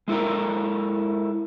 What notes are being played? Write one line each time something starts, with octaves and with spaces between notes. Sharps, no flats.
G#3 E4 A4 A#4